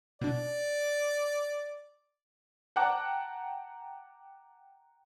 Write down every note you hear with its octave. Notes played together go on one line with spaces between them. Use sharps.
B2 D4 D5
F#5 G5 A5 A#5 D6 F#6